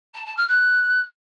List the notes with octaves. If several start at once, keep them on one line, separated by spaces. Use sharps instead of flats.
A5
A5
F6
F#6